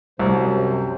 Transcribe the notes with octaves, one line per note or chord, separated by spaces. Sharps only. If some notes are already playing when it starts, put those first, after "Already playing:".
C2 F#2 C3 F#3 C5